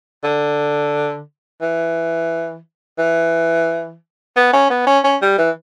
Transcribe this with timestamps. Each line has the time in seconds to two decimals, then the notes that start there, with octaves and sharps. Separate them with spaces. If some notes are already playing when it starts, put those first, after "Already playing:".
0.24 D3
1.62 E3
2.98 E3
4.36 B3
4.53 C#4
4.70 B3
4.87 C#4
5.04 C#4
5.22 G3
5.38 E3